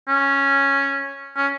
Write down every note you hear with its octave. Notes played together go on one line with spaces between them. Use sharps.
C#4
C#4